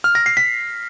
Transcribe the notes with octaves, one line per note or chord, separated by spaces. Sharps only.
F6
A#6
C7
B6